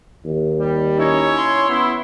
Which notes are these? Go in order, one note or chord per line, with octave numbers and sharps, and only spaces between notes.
D#2
G3
C#4 D#4 E4 C#5
C6
B3 E4